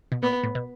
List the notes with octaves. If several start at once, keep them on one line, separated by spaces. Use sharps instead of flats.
B2
A#2 B3
A2
B2